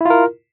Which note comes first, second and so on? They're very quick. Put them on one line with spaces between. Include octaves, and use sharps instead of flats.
E4 F4 A#4